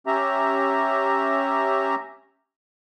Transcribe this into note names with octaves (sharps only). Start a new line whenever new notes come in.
C#4 G4 E5 A#5